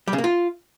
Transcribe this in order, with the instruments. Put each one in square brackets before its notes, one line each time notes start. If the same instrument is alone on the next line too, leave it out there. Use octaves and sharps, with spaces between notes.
[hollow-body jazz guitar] G3
C#3
A#3
F4